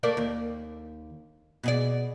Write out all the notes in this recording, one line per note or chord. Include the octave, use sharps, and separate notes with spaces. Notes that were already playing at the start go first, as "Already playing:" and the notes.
A3 A#3 D5
D#2
B2 G#4 D5